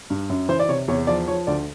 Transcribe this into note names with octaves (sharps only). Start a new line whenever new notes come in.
G2
F#2
E3 C5
D5
C3 C#5
E2 C#5
F3 D5
F3 C#5
D2 D5